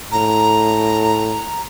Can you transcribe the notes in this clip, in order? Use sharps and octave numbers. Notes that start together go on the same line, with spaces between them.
A2 A#5